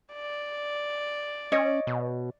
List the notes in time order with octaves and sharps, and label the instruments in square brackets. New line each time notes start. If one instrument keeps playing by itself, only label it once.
[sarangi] D5
[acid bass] C#4 [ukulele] C#5 D#5
[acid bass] B2